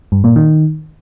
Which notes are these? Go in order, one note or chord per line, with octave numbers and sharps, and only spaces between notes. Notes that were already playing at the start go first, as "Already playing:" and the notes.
G2
A#2
D#3